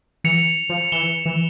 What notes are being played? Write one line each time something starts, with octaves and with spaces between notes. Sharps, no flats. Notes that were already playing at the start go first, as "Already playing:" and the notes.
E3 C#7 F7
F3
E3 E7 G7
E3